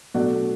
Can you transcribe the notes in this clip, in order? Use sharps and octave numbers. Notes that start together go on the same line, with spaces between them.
B2 F#3 A3 D4 F#4